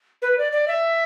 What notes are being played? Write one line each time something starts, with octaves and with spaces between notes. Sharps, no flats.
B4
D5
D5
E5